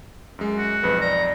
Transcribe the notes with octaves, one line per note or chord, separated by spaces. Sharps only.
F#2 G#3
F#4
B1 F2 B4
D5 A#5